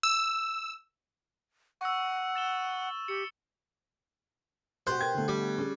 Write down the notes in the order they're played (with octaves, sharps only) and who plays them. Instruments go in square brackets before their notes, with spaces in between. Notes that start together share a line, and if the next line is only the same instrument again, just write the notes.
[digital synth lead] E6
[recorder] F#5 [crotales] C#6 E6
[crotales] A6 E7 G7
[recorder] G4 [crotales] C#7
[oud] B2 B3 G4 [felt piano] F#4 F#6 [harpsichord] C5
[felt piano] A#4 G#6
D3 A3
[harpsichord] G3
[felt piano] C#4 G#4